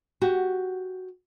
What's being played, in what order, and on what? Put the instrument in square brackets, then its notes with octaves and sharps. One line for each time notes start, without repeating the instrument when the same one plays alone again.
[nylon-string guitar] F#4 G4